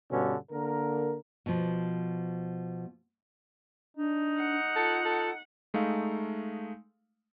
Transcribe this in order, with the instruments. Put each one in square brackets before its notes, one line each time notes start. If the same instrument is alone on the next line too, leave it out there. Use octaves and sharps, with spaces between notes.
[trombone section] G2 B2 D3 C#4
D3 A#3 A#4
[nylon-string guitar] B2 F3
[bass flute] D4 [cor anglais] D#4
[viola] F#5
[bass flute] F4 [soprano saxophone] A4
[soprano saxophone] A4
[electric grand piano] G#3 A3 D#4 F5